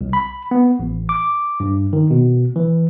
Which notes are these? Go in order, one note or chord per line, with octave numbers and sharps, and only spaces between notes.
C2
B5
B3
A1
D6
G2
D#3
B2
E3